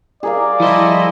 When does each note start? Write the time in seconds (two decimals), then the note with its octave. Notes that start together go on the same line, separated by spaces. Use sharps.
0.23 G#4 A#4 D5 F5
0.60 F3 G3 E4 C5 D#5